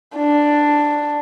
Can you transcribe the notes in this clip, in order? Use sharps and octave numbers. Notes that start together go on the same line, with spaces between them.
D4